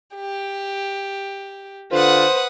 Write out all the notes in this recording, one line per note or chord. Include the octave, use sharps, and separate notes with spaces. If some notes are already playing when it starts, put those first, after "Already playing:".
G4
D3 F4 B4 C5 F#5 D#6